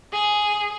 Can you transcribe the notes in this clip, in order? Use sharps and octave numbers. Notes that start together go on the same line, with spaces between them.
G#4